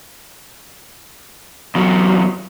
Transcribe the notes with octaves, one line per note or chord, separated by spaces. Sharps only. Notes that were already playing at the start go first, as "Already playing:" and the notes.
E2 F#3